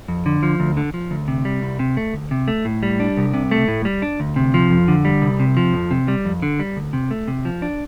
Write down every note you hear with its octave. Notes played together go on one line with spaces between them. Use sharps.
F2
D3
F3
D2
D3
F3
D2
C3
G3
C2
C3
A3
D2
C3
A3
A2
G3
D4
C2
C3
A3
A2
G3
D4
D2
C3
F3
F2
D3
G3
C2
C3
F3
F2
C3
G3
F2
D3
G3
D2
C3
A3
C3
F3
D4